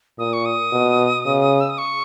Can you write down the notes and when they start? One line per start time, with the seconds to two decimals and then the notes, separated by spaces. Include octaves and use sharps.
0.18 A#2 D#6
0.33 C#6
0.45 D#6
0.72 B2
1.26 C#3
1.60 E6
1.70 D#6
1.78 C#6